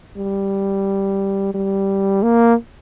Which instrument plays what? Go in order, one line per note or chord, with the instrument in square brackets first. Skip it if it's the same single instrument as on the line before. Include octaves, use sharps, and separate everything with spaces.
[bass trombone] G3
G3
A#3